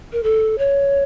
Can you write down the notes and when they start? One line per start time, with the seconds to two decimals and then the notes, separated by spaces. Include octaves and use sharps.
0.13 A#4
0.23 A4
0.58 C#5